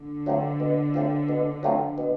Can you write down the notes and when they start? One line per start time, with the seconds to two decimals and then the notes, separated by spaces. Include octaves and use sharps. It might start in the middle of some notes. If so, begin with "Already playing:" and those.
Already playing: D3
0.26 F#3 A3 C4 F4
0.60 B2
0.94 F#3 A3 C4 F4
1.28 B2
1.63 F#3 A3 C4 F4
1.98 B2